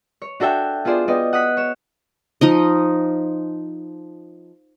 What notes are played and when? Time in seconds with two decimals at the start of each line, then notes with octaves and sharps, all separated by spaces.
0.22 C#5
0.40 D4 F#4 A4 E5 G5
0.85 B3 F4 G#4 C5 D5
1.08 B3 D5 D#5 G5
1.33 F#5 D#6 F#6 B6
1.57 C#5 E7
2.41 F3 D#4 D#5